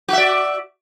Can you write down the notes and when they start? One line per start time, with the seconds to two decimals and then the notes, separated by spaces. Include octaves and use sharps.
0.08 F#4
0.13 E5
0.18 D5